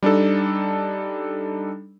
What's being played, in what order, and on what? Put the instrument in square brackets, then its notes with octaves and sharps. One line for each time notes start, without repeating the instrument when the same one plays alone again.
[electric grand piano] G3 D4 D#4 A4